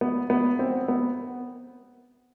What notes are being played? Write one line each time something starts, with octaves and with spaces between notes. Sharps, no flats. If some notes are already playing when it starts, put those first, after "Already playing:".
B3
B3
C4
B3